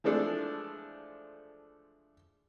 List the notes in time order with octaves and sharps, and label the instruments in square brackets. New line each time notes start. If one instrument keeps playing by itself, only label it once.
[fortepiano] E3 F3 G#3 A3 D4 A4